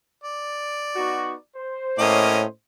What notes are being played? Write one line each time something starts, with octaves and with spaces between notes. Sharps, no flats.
D5
B3 D#4 F#4
C5
A2 A#3 C#4 D#5